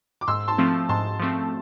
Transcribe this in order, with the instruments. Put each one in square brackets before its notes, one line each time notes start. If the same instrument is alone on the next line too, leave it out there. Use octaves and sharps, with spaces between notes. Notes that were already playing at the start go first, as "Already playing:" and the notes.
[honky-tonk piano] D6
[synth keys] G#2 [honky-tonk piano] C6 E6
[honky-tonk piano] A5 C6
[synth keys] F3 A3 C4
[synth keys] G#2 [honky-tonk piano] A5 C6
[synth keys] F3 A3 C4